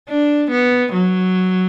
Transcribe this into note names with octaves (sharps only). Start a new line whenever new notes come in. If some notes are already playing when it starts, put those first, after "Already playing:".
D4
B3
F#3